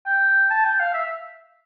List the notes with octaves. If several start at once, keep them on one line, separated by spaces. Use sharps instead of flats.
G5
A5
G5
F5
E5